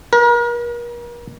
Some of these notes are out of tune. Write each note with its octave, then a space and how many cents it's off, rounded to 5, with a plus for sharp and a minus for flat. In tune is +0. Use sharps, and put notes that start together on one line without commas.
A#4 +40